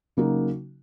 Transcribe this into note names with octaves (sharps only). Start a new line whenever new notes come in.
C#3 F#3 A#3 D#4 F#4